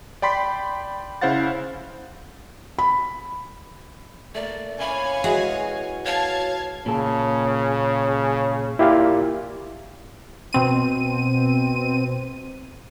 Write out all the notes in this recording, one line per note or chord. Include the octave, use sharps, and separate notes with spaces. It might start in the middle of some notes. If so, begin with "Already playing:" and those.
D5 G5 B5 C6 B6
C#3 E4 C5 F5 F#5 A6
B5
A3 A#3 D5
C#4 E4 C#5 D5 F5 G#5 B5
E3 G#3 F#4 G#4
C#5 F5 A5 G#6
A#2 C#3 A4
A#2 E4 G4 F5
B2 C4 D#7